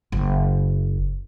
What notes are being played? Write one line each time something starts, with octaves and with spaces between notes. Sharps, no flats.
F#1